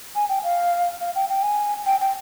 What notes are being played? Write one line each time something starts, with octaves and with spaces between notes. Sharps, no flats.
G#5
G5
F5
F5
G5
G5
G#5
G5
G5